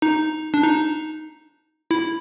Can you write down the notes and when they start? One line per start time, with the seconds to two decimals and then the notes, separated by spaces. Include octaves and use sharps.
0.02 D#4
0.54 D4
0.64 D#4
1.91 E4